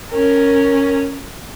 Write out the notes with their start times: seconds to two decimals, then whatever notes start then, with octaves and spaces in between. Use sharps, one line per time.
0.11 C#4 A#4